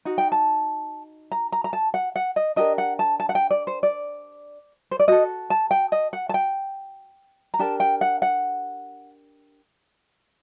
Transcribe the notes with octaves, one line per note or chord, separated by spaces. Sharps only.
D#4 F#4
G5
A5
A#5
A#5
A#5
A5
F#5
F#5
D#5
D4 G4 A#4 D#5
F#5
A5
A5
F#5
G5
D5
C5
D5
C5
D5
F#4 A4 D#5
A5
G5
D#5
F#5
A5
G5
A#5
D4 G4 A#4 A5
G5
F#5
F#5